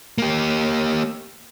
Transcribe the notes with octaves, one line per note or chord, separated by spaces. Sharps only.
A#3 G4